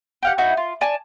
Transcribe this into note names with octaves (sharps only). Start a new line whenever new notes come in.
G4 F5 F#5
D#4 E4 F#4
F4
D5 G#5 A5